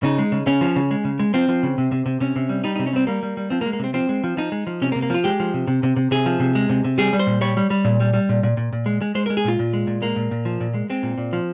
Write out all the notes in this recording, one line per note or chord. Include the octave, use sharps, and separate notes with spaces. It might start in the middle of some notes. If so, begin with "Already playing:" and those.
C#3 D#4
G#3
C#3
C#3 C#4
F3
C#3
G#3
C#3
G#3
F3 C4
F3
C#3
C3
C3
C3
C3 C#4
C3
G3
G3 D#4
C3 D#4
C#4
G3 C4
G3 A#3
G3
G3
F3 C4
A#3
G#3
A#3
C3 C4
F3 C4
G#3
F3
F3 D#4
G#3
F3
C3 C#4
A#3
C3
A#3
F3 F4
G#3 G4
F3
C3
C3
C3
C3
C3 G#4
F3
C3
G#3
C3
C3
G3 G#4
G3
C5
A#2
G3 C#5
G3
G3
A#2
G3
G3
A#2
A#2
A#2
A#2
G#3
G#3
G#3 C5
G#3 A#4
G#4
A#2 F4
A#2
G#3
A#2
G#3 A#3
A#2
A#2
F3
A#2
G#3
G#3 C4
A#2
A#2
F3